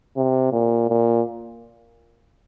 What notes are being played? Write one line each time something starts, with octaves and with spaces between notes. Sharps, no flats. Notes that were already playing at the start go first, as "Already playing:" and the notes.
C3
A#2
A#2